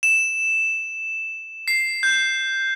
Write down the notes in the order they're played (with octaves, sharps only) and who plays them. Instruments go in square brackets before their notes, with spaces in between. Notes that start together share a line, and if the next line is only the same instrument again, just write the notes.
[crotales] E7
C7
G6